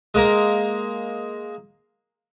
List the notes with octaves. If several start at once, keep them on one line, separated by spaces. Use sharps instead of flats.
G#3 A#3 A#4